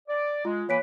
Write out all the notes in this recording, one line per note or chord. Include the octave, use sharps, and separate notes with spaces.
D5
G#3 F4
E3 A#3 B4 C#5 B6 D7